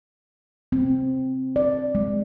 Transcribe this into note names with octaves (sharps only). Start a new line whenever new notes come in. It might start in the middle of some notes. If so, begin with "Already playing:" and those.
C4
D5
G#3